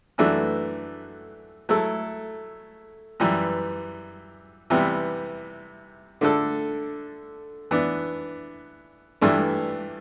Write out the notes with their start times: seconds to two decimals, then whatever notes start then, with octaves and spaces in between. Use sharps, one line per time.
0.18 F#2 E3 A3 D4 F#4
1.69 F#3 A3 E4 A4
3.20 F#2 E3 G3
4.70 C3 E3 G3 B3
6.21 D3 A3 D4 A4
7.71 E3 B3 D4
9.21 G2 E3 A3 D4